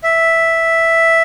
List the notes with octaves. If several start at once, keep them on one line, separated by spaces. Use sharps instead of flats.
E5